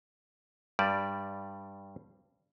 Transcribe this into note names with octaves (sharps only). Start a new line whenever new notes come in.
G2 G3 D5